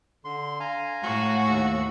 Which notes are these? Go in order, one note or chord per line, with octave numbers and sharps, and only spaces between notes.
D3 C6
F5 G#5 A#5
A2 F#4
D#2 E6